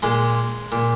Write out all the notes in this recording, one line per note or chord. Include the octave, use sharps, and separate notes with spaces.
A#2 G#3
A#2